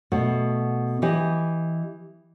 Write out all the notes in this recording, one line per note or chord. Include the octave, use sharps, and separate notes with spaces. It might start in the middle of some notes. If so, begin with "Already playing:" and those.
B2 A3
E3 G4 D#5